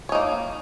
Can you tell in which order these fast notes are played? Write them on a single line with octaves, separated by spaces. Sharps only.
C#5 D#4 A#3